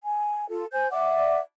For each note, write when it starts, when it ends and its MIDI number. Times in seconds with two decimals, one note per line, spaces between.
0.03 0.46 80
0.50 0.65 65
0.50 0.65 69
0.72 0.89 72
0.72 0.89 80
0.72 0.89 91
0.91 1.38 74
0.91 1.38 76
0.91 1.38 78
0.91 1.38 86